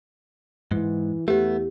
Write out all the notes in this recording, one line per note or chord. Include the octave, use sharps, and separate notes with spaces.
G#2 E3
E2 A3 B3 G4